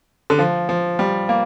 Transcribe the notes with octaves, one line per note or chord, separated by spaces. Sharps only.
D3
F3
F3
G3
A#3